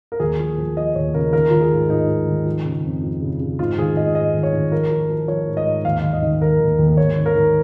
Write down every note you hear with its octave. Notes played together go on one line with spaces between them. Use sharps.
A#4
D#2 G#4
F3
F3
F3 D#5
D#2 C#5
C#3 A#4
D#3 A#4
D#3 F4
G#4
G#2
G#2 D#4
G#2
D#3
F3
C#3
F2
F3
C#3
C#3
G#2 F4
D#3 G#4
G#2 D#5
G#2 D#5
D#3
C#5
D#3
F3 A#4
F3
F3
F3 C#5
G#2
D#5
G#2
D#2 F5
D#2
D#5
D#3
D#3 A#4
D#2
D#2
A#4
G#2 C#5
D#3
A#4
D#3